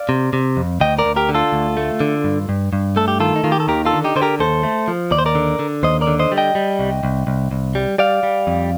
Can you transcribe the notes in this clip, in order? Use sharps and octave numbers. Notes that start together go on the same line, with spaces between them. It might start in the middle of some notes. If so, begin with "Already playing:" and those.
Already playing: D5 F5
C3
C3
F2
D2 D#5 G5
A#4 D5
D2
G4 A#4
D3
F4 A4
D2
A3
D3
G2
G2
G2
A3 A4
G4
D#3 F4 A4
D#4
D#3 F4
G4
A4
D#2 G4 A#4
F4 A4
D3
D#4 G4
D3 C5
G4 A#4
D#2 A4 C5
A3
F3
D#2 D5
C5
A#4 D5
D3
D3
D#2 C5 D#5
A#4 D5
D3
C5 D#5
G3
D#5 G5
G3
C2
C2
C2
C2
G3
G3 D5 F5
G3
F2